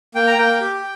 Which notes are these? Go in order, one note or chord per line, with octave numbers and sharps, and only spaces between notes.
A#3 G5
A#5
A#3 G5
G4